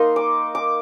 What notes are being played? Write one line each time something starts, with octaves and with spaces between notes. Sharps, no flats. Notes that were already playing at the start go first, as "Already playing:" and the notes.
Already playing: A#3 D#4 C6
D6
D6